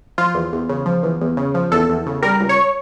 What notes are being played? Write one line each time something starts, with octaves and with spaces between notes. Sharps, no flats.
F3 F4
E2
E2
C#3
F3
E2
E2
C#3
F3
E2 A4
E2
C#3
G3 A#4
C#2
C#5